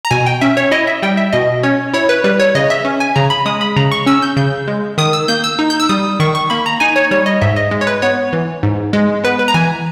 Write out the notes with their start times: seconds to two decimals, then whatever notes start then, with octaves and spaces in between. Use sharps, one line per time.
0.05 A#5
0.11 B2 G#5
0.26 G5
0.41 C#4 E5
0.57 C#5
0.71 E4 D#5
0.87 E5
1.03 G3 G5
1.17 E5
1.33 B2 D#5
1.63 C#4 C#5
1.94 E4 C#5
2.09 B4
2.24 G3 B4
2.40 C#5
2.55 C#3 D#5
2.70 E5
2.85 C#4
3.00 G#5
3.16 C#3 A#5
3.30 B5
3.46 G#3 D#6
3.61 B5
3.76 C#3 A#5
3.92 C#6
4.06 C#4 E6
4.22 G6
4.37 C#3 G6
4.68 G#3
4.98 D#3 D#6
5.13 E6
5.28 A#3 G6
5.44 E6
5.59 D#4
5.70 G6
5.80 E6
5.89 G3 D#6
6.20 D#3 C#6
6.35 C#6
6.50 A#3 B5
6.66 A#5
6.80 D#4 G#5
6.96 C#5
7.11 G3 C#5
7.26 D#5
7.42 G#2 E5
7.56 D#5
7.71 G#3
7.81 C#5
7.87 B4
8.02 B3 C#5
8.33 E3
8.63 G#2
8.93 G#3
9.24 B3 B4
9.39 B4
9.48 A#5
9.54 E3 G#5